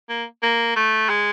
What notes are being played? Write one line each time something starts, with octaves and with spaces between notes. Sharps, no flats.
A#3
A#3
A3
G#3